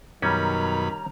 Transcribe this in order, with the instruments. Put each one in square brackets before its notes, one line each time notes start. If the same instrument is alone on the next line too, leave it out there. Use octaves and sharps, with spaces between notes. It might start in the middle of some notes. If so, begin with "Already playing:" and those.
[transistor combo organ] F#2 B2 B5 [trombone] D#3 [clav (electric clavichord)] G3 C#4 [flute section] A#5